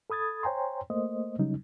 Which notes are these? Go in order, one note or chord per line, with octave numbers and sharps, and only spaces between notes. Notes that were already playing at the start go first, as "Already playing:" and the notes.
A4 B5 D#6 G#6 A6
C5 C#5 G5 G#5 A#5 C6
A3 A#3 C5 D#5
C#3 F#3 G3 C#4 D#4